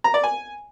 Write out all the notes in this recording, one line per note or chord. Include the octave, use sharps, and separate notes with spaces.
A#5
D5
G#5